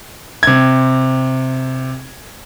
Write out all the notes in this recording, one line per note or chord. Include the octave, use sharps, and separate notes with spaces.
C3 G#6